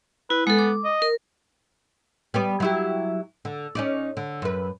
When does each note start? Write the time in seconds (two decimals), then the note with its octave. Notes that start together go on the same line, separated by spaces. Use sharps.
0.30 E4 B4
0.47 G#3 B3 A4
0.58 D6
0.84 D#5
1.02 A#4
2.34 G3 B3 D5
2.60 F#3 E4 G4
3.45 D3
3.75 C#4 D#4 D5
4.17 D3
4.42 F#2 B4